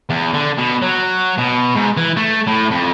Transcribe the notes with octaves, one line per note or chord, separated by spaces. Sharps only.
E2
D3
B2
F#3
B2
G#2
E3
A3
A2
F2